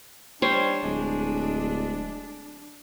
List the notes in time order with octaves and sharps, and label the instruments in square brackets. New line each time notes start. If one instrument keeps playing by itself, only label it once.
[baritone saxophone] G3 [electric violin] D4 [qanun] C5 C#5
[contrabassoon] D1 [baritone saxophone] G#3